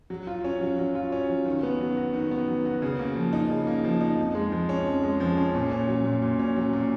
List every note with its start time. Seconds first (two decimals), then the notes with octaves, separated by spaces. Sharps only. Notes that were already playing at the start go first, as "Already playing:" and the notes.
0.10 F#3
0.27 F4
0.44 C#4
0.61 F#3
0.78 F#3
0.95 F4
1.12 C#4
1.30 F#3
1.46 D#3
1.63 B3
1.80 F#3
1.97 F#4
2.14 D#3
2.31 B3
2.48 F#3
2.65 F#4
2.82 C#3
2.99 A#3
3.16 F3
3.33 D#4
3.50 C#3
3.67 A#3
3.84 F3
4.01 D#4
4.18 F2
4.35 G#3
4.52 F3
4.69 C#4
4.86 F2
5.03 G#3
5.20 F3
5.37 C#4
5.54 A#2
5.72 C#4
5.88 F#3
6.05 A#2
6.22 A#2
6.39 C#4
6.56 F#3
6.73 A#2